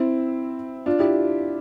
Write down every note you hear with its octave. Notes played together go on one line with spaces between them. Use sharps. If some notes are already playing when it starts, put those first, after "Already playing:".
Already playing: C4 E4
D4 F4
E4 G4